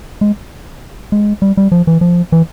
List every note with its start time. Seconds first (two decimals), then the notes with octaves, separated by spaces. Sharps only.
0.21 G#3
1.12 G#3
1.42 G3
1.57 G3
1.72 F3
1.87 E3
2.01 F3
2.32 E3